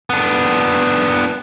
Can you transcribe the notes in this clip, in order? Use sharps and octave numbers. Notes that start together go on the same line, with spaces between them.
B3 D4